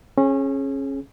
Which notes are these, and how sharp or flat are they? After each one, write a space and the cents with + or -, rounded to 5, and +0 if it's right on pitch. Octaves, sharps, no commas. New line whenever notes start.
C#4 -25 G#4 +20